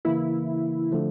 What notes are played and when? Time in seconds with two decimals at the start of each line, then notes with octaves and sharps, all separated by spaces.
0.05 C#3 E3 A#3 E4
0.92 D3 F3 A3